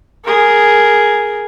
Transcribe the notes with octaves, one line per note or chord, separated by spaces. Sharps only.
G#4 A#4